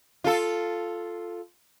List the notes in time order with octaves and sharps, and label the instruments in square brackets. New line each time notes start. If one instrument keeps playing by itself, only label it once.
[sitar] F4 A4